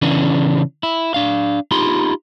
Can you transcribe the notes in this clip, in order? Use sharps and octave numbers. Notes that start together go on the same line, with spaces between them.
C#3 E3 B3 C#4 D4
E4
D4 F5
D#4 F4 G4 B5 C6